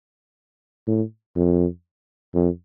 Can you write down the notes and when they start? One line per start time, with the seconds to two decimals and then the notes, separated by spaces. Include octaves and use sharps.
0.88 A2
1.36 F2
2.34 F2